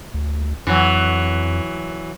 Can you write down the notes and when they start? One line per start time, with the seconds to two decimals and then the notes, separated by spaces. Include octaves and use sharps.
0.14 D2
0.67 F2 E3 F#3